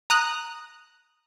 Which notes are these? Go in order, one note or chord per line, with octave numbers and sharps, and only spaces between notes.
A#5 D#6 F#6